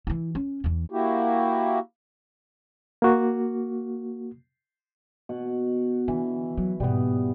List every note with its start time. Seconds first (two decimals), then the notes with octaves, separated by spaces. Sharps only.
0.07 E3 E4
0.35 C#4
0.64 E2 E3
0.90 A#3 E4 F#4 G4
3.02 A#3 F#4
5.29 B2 F#5
6.08 D3 E3
6.57 F#3
6.80 G#2 B2 G3 B3